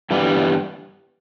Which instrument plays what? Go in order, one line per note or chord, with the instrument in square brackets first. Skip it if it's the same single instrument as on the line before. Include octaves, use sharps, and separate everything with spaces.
[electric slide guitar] G2 E3 G3 B3